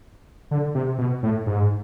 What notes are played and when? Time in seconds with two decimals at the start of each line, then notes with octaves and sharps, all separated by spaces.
0.51 D3
0.75 C3
0.98 B2
1.23 A2
1.46 G#2